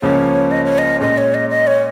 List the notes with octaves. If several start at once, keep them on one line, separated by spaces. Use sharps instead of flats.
C#2 C#3 F3 A#3 C#4 C#5
D#5
C#5
D#5
A#2 G#3 C#4 D#5
C#5
D#5
D#5
C#5